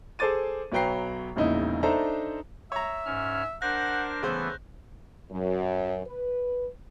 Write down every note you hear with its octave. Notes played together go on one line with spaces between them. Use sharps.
G#4 A4 C5 D6 A6 D#7
B1 F#3 B4 G5 A#5 C7
E1 A#1 C#3 D#4 E4 D#5
D4 D#4 A4 C5 E5 A#5
C#5 E5 A#5
G#2 C#4 F6
D4 A#4 C5 F#5 F#6 G6 A#6
C#3 E3 A3 B3 C5
F#2
B4